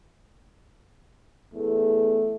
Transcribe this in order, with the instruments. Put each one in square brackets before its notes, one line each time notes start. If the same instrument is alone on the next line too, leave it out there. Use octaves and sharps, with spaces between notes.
[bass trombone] E2 [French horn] A3